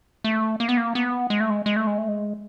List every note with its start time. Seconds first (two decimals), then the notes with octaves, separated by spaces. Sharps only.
0.24 A3
0.60 A#3
0.69 B3
0.77 A#3
0.95 B3
1.30 G#3
1.40 A3
1.50 G#3
1.66 G#3
1.76 A3
1.87 G#3
1.98 A3
2.08 G#3